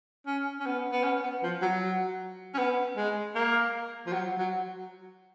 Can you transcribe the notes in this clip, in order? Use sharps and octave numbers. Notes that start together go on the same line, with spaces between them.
C#4
C#4
B3
B3
C#4
B3
F3
F#3
C#4
B3
G#3
A#3
F3
F#3
F#3